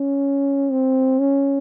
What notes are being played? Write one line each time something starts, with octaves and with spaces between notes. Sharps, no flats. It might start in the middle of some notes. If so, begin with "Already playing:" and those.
Already playing: C#4
C4
C#4